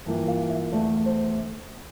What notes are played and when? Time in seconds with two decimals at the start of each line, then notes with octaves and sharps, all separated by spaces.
0.06 G2 E3 A#3 F4
0.27 F5
0.49 E5
0.71 E2 D3 A3 D5
1.06 C5